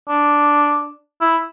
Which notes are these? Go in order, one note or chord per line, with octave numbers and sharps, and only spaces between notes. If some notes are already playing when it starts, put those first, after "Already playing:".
D4
E4